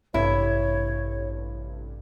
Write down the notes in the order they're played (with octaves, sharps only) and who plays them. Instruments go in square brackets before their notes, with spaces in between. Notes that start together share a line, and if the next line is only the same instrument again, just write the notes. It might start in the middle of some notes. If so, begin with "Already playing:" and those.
[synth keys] A1 G2 C3 [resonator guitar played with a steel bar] E4 [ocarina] C#5